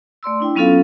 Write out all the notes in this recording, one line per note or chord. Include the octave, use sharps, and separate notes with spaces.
A3 D5 C6 E6
D4 E4 G5
F#3 B3 C#4 F4 A4 F5